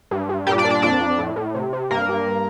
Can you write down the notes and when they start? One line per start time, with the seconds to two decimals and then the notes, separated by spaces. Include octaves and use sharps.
0.11 G2
0.29 G2
0.47 A#2 G3 G4
0.58 D4 D5
0.64 A#2
0.70 D4 D5
0.82 F2 D4 D5
1.01 F2
1.18 A2
1.36 A2
1.55 C3
1.73 C3
1.90 G2 A#3 A#4
2.09 G2